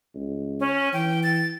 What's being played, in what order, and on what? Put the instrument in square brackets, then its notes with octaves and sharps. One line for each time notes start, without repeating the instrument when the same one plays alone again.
[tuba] C#2
[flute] C#4
[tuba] E3 [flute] G5
[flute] A6